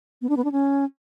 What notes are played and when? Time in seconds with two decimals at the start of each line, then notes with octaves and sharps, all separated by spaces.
0.22 B3
0.29 D4
0.37 B3
0.44 D4
0.52 C#4